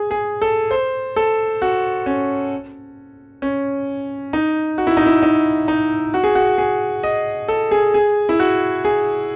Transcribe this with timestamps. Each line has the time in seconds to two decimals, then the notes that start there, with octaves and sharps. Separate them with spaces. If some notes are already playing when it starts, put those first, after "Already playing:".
Already playing: G#4
0.11 G#4
0.42 A4
0.71 C5
1.16 A4
1.62 F#4
2.06 C#4
3.42 C#4
4.33 D#4
4.78 F#4
4.87 E4
4.97 D#4
5.06 E4
5.23 D#4
5.68 D#4
6.14 F#4
6.24 G#4
6.35 F#4
6.58 G#4
7.03 D#5
7.48 A4
7.71 G#4
7.94 G#4
8.29 E4
8.40 F#4
8.85 G#4